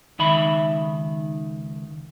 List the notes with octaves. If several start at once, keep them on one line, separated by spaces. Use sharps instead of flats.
C#2 D#3 E5 B5